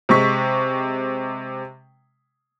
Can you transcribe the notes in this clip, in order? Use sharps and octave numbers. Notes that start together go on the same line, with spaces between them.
C3 G#3 C#6 B6